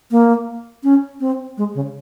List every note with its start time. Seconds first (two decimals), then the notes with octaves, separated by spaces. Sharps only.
0.11 A#3
0.83 C#4
1.20 C4
1.58 G#3
1.75 C#3